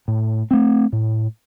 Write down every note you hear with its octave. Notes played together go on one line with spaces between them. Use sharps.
A2
A3 C4
A2